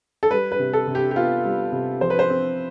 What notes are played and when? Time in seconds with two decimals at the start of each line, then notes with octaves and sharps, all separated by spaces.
0.23 A4
0.31 G3 B4
0.52 B4
0.59 C3
0.73 A4
0.87 C3
0.95 G4
1.11 G4
1.16 B3 F4
1.44 G3
1.72 C3
2.01 F3 C5
2.10 B4
2.19 C5
2.30 C4